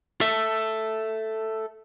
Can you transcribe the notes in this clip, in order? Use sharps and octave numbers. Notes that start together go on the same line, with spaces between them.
A4 E5